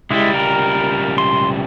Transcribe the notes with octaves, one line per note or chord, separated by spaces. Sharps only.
C#2 G3 G#3 E4
A#4
C6